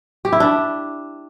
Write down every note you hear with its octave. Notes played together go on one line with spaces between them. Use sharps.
G4
E4
D4